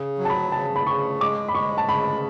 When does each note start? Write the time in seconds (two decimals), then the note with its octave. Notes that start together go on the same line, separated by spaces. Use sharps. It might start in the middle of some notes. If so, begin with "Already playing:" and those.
Already playing: C#3
0.19 F#3
0.25 A5
0.30 B5
0.52 C#3 A5
0.76 B5
0.87 C#3 C#6
1.20 G#3 D6
1.48 B5
1.54 G#3 C#6
1.78 A5
1.89 C#3 B5